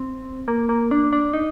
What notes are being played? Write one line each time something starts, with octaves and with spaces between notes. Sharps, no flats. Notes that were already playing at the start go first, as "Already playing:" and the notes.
Already playing: C4
A#3
A#3
D4
D4
D#4